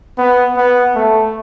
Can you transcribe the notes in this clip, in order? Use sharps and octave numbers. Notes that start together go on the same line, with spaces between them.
B3
B3
A3